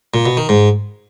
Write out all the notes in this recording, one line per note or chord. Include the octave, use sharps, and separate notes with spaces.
A#2
B2
D#3
G#2